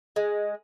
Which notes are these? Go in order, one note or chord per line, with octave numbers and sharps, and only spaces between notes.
G#3